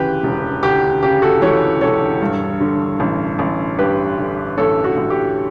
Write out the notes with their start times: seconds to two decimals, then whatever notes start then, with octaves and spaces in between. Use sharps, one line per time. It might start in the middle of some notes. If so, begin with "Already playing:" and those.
Already playing: D2 C#3 E3 G4 B4
0.23 E1
0.63 D2 G4
1.03 C#3 G4
1.22 F#4 A4
1.42 E3 A4 C#5
1.81 E1 A4 C#5
2.21 G2
2.60 D3
3.00 A1
3.39 A1
3.78 G2 G4 B4
4.18 D3
4.58 A1 A4 C#5
4.84 F#4 A4
4.97 A1
5.10 G4